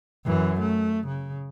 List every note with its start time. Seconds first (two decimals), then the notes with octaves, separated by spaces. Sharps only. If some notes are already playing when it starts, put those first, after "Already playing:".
0.25 F#2 E3
0.60 A3
1.07 C#3